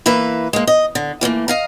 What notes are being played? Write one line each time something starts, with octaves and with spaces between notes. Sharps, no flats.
E3 A#3 B4 E5
G#3 A#3
D#5
D3
E3 F3 A3 A#3
D#5 F5 A#5